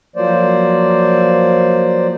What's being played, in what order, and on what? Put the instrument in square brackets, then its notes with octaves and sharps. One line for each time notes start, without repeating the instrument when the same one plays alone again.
[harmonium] F3 F#3 A#3 C5 D5